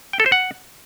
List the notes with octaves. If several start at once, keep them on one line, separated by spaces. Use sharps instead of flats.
G5
A4
C5
F#5